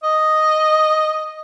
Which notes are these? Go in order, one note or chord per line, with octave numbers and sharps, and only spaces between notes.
D#5